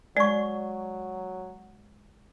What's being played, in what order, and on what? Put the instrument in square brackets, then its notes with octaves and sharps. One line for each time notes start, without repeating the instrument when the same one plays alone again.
[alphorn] F#3 [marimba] G#3 [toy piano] D5 C#6